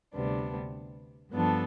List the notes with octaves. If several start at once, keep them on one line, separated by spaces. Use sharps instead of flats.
D2 C3 G3 B3 D4
G2 F3 B3 D4 A4